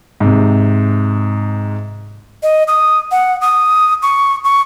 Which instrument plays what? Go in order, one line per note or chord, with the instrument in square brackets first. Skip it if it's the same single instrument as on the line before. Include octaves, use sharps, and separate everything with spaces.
[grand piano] G#2 C3
[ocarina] D#5
D#6
F#5
D#6
C#6
C#6